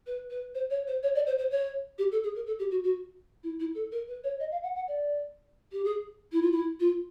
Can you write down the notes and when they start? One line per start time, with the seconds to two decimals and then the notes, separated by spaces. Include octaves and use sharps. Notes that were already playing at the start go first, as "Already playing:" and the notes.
0.07 B4
0.30 B4
0.55 C5
0.70 C#5
0.87 C5
1.03 C#5
1.15 D5
1.27 C5
1.38 C5
1.51 C#5
1.98 G4
2.12 A4
2.24 G#4
2.35 A#4
2.47 A4
2.59 G4
2.71 F#4
2.84 F#4
3.43 E4
3.60 E4
3.75 A4
3.92 A#4
4.08 B4
4.24 C#5
4.40 D#5
4.52 F5
4.63 F#5
4.75 F#5
4.88 D5
5.72 G4
5.84 G#4
6.32 E4
6.42 F4
6.52 E4
6.80 F4